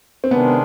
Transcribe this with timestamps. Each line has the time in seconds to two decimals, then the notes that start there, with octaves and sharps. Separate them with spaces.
0.24 C4
0.31 C3 D#3 G#3 B3 D4